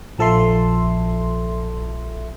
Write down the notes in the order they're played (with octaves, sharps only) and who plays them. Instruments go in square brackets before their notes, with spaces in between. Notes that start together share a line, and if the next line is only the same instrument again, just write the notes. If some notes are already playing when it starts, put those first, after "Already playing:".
[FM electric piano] A#1 F3 A4 E5 C6